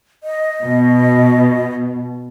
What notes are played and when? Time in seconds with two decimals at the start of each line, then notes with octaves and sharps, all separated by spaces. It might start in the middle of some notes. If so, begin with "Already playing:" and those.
0.23 D#5
0.62 B2